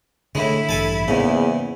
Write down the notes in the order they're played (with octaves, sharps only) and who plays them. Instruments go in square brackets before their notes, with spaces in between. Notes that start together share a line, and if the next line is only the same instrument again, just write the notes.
[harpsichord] A2 G#3 [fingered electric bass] D3 [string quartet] E4
[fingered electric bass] A1 G2 [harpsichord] A4 G#5 A5
[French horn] E2 [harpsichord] G#2 C#3 [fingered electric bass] A#3